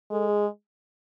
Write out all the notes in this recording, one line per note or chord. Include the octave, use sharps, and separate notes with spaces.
G#3 A4
G#4